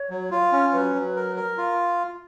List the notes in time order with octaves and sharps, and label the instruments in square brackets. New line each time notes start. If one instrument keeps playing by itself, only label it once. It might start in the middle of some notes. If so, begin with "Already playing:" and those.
Already playing: [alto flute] C#5
[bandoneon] F#3
F4
C#4
[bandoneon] F#3 [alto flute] B4
[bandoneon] F#3
A#4
A#4
F4